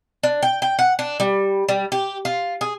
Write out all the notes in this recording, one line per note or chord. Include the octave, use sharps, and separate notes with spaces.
D4
G5
G5
F#5
D4
G3
G3
G4
F4
G#4